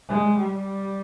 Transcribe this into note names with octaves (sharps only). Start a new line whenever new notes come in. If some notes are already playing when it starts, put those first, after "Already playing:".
G#3
G3